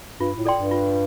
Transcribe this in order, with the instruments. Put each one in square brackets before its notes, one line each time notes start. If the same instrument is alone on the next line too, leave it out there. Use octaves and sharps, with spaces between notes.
[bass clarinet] G2 [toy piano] F4
[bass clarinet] A2
[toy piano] A4 D5 G5 C6
[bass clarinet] G2
[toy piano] F4